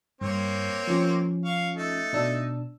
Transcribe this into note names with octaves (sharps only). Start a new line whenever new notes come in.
G2 A#3 C4 C#5
F3 C#4
F5 C#6
A3 D#4 A4
B2 D4 E6